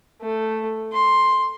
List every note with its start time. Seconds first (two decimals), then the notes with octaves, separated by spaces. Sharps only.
0.22 A3
0.93 C6